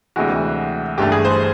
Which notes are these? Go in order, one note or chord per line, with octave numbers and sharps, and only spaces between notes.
D2 C3 E3 G#3 F#4
G1 G2 E3 A3 G4
G#4
C5